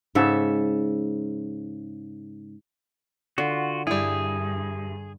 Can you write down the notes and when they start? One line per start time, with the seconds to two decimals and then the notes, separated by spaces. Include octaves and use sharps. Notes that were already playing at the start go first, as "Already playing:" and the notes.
0.15 G#2 C#3 A4 E5
3.38 D3 F4 F#4
3.87 G2 G3 E4 G#4